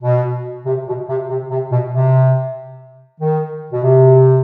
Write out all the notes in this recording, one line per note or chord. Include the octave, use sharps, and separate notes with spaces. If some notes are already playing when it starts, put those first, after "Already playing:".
B2
C3
B2
C3
C3
C3
B2
C3
D#3
B2
C3